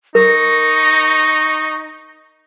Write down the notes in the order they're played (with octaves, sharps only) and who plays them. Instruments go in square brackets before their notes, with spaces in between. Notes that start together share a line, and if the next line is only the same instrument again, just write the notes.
[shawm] D#4 [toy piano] A#4 [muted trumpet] C#6 [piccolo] A#6